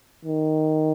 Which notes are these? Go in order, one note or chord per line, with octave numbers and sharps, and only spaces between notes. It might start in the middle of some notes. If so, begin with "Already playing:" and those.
D#3